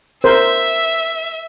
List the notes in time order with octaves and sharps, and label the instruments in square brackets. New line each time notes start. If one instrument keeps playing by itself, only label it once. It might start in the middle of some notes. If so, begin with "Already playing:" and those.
[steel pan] A#4 C5 [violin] E5